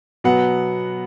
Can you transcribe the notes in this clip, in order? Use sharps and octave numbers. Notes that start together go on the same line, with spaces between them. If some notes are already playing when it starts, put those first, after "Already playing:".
B2 F#3 B3 F#5